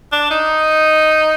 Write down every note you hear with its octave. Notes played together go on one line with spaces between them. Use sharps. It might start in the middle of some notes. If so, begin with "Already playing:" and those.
D4
D#4